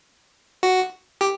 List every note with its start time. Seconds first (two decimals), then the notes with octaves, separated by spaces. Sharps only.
0.63 F#4
1.21 G4